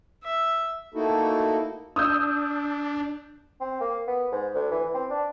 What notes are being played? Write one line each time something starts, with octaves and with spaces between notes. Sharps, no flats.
E5
A3 A#3 D#4 E4 F#4 A4
D4 D#6 E6 G6
C4
A#3
B3
G#2
D2
E3
C4
D4